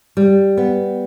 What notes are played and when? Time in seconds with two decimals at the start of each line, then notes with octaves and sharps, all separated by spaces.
0.17 G3
0.57 B3